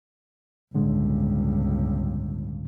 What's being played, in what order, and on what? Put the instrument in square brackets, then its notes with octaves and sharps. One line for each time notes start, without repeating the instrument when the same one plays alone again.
[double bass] G1 C#2 [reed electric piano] A2 D3 G#3